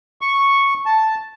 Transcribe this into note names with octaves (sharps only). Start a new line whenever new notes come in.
C#6
A5